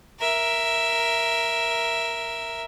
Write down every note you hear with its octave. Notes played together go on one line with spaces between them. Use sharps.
A#4 E5